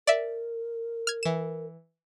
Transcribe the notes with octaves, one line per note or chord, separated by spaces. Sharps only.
A#4 D5 E5
F6 G#6
E3 E7